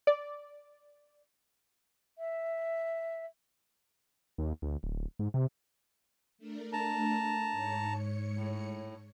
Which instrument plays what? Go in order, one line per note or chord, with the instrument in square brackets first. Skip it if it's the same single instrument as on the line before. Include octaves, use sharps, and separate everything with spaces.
[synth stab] D5
[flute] E5
[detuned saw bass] D#2
D2
D1
G#2
C3
[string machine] A3 D4 A#4
[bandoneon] A5 A#5
[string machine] G#2 C#5 C#7
[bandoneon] A2